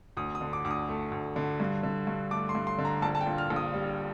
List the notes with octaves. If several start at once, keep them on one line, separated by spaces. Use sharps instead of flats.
D2 D#6
D#6
D3
D6
D2 D6
D#6
A3
D2
D3
G2
D3
G2
A3 D6
C6
G2
C6
D3
A#5
A#1 A5
A5
G5
A#2
F6
A#1
D#6
G3